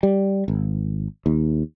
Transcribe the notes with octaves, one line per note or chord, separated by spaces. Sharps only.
G3
G#1
D#2